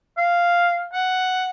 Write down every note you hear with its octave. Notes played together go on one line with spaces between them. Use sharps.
F5
F#5